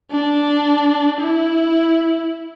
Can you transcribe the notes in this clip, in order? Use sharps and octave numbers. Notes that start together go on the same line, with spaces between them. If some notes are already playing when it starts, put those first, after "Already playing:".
D4
E4